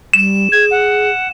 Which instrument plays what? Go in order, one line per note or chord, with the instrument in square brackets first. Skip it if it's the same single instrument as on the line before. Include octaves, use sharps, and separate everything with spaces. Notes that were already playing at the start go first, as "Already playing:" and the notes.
[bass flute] G3 [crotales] E7
[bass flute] G#4 [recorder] G#6
[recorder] F#5